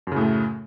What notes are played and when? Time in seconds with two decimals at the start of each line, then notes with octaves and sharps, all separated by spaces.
0.07 F#2
0.12 C#3
0.16 A2
0.21 A3